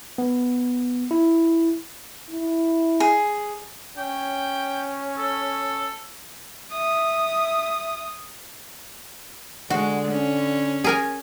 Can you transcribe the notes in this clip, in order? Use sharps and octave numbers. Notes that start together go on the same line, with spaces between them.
B3
E4
E4
G#4
C#4 G5
A4
E5 D#6
D3 G#3 F#4
C#4
G#4 A#4 G#5